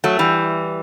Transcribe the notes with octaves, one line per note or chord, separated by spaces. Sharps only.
F#3 A3
E3 G3